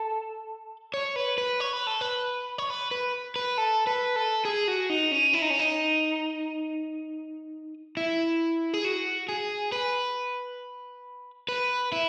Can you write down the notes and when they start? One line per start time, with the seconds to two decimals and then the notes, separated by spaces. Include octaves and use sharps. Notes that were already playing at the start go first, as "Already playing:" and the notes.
Already playing: A4
0.94 C#5
1.16 B4
1.38 B4
1.60 C#5
1.73 B4
1.87 A4
2.01 B4
2.58 C#5
2.70 B4
2.91 B4
3.36 B4
3.58 A4
3.87 B4
4.16 A4
4.45 G#4
4.68 F#4
4.90 D#4
5.12 C#4
5.33 E4
5.42 D#4
5.50 C#4
5.59 D#4
7.97 E4
8.74 G#4
8.85 F#4
9.29 G#4
9.72 B4
11.49 B4
11.92 E4